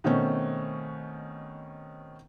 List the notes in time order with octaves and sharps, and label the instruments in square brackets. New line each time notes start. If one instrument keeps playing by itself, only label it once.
[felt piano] B2 D#3 A3 C4 C#4